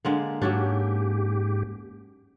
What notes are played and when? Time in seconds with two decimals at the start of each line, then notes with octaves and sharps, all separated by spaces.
0.05 D3 G#3 A#3
0.42 G#2 F#3 C#4 D4 G4